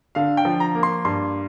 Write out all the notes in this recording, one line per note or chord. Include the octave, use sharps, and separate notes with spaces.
D3 F5
G5
F3
A#5
A#3
C6
G2 C6